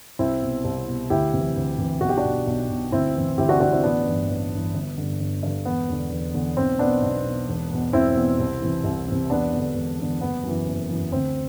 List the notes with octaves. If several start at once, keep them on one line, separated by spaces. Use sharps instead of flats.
C2 C4 E4
B2
C2
B2
D2 E4 G4
C3 E3
D2
C3 E3
B1 F#4
G4
D4 F#4
B2
B1
B2
D2 C4 E4
C3 E3
D2 E4 G4
D4 F#4
C3 E3 D4 F#4
C4 E4
A1 B3 D4
G2 E3
A1
G2 E3
G1
G2 D3
G1
G2 D3
E1 B3
E2 D3
E1
E2 D3
B1 C4
B2 B3 D4
B1
B2
E1
E2 B2
E1 C4 E4
E2 B2
C2
C3 E3
C2
C3 E3
E1 B3 D4
E2 D3
E1
E2 D3
F#1 B3
F#2 E3
F#1
F#2 E3
D2 C4